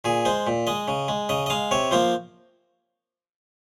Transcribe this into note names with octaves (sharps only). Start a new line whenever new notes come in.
A#2 G#4
G#3 C5
A#2
G#3 D#5
C#3
G#3
C#3 D#5
D#5
G#3 F5
C3 C#5
F3 A#3 C5